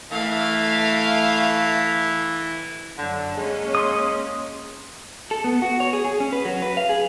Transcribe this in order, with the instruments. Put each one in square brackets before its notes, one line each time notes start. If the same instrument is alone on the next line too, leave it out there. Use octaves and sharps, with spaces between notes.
[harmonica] E3 E4 [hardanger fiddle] A3 F5
[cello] F#2 F#3 [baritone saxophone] D3
[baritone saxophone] G#3 [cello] A#3 C#4
[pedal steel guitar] C6 D#6
[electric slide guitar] A4
B3
F#4
C#5
G#4
G#4
C#4
B4
F#3
B4
F5
G#4